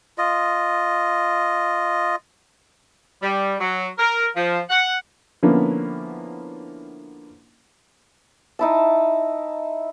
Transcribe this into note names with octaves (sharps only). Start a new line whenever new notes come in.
F4 D#5
G3
F#3
A#4
F3
F#5
D3 F3 A#3 B3 C#4 E4
D#4 E4 A5